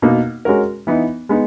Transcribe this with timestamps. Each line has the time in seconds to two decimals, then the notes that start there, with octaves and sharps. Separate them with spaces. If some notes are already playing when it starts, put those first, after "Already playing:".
0.02 B2 A#3 D#4
0.45 G#3 C#4 F#4 A#4
0.87 E3 B3 D#4
1.29 G#3 B3 D#4